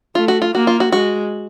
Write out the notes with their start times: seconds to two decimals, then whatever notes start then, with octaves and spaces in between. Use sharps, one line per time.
0.15 A3 F4
0.28 F#4
0.42 F4
0.54 A#3 F#4
0.67 F4
0.80 F#4
0.92 G#3 F#4